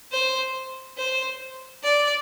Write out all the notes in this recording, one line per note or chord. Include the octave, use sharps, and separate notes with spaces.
C5
C5
D5